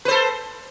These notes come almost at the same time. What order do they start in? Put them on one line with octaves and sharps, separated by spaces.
B4 C5 A4